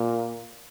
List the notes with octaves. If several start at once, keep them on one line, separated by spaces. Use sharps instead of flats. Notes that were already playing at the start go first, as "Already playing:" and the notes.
Already playing: A#2